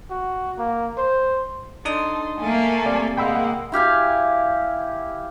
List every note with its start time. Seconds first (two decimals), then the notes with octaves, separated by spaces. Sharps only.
0.10 F#4
0.58 A#3
0.98 C5
1.85 D4 D#4 A4 C6 D#6
2.39 A3 A#3 A4 G#5
2.86 C3 D5
3.18 G#3 A#3 F#5 G5 B5 E6
3.72 E4 G4 F5 G#5